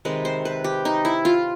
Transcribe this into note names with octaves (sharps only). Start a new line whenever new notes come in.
C3 D#3 G#3 B4
C5
B4
G4
D#4
E4
F4